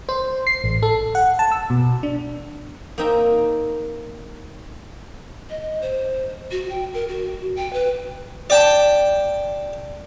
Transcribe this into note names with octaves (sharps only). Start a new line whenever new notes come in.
C5
C7
A1
A4
F#5
A5
E6
B2
D4
A#3 C4 D#4 E5 G5 A#5
D#5
C5
F#4
G5
A#4
F#4
G5
B4
D5 G5 A5